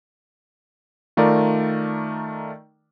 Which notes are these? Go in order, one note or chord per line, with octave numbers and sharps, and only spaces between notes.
D#3 A3 F4 A#4 D5